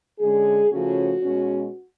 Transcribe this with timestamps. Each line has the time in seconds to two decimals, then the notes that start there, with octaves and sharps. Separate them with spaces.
0.19 D3 G#3 C#4 G#4
0.70 C#3 F3 A3 C#4 F#4
1.22 B2 G#3 C#4